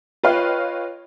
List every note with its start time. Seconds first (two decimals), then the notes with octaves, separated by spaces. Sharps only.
0.23 F4 B4 C#5 D#5 F5 G5